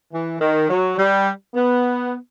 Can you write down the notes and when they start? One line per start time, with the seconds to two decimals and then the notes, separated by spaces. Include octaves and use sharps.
0.13 E3
0.40 D#3
0.69 F#3
0.98 G3
1.54 B3